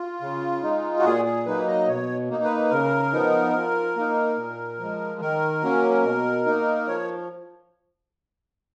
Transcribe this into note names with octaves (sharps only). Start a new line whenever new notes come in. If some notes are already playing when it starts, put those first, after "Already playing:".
Already playing: F4
C#3
G#3 D#4
F#4
A#2 G#4
G#4
F#3 A#3 D#4 B4
D#5
B2 C#5
A#3 D#4
B4
C#3 A#4
F3 B3 D#4
F3
A#3 D#4
A#2
F3 G#3
D#3 A#4
F#3 A#3 C#4
B2
A#3 D#4
F3 C#5